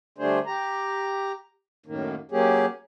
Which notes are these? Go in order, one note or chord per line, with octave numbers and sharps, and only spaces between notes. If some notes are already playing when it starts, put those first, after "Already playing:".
D3 G3 A3 D4 G#4 C5
G4 A#5
F#2 A2 D#3 A#3
F#3 A#3 C#4 G4 G#4